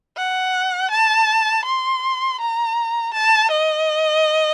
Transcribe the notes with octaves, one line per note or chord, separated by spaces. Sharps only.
F#5
A5
C6
A#5
A5
D#5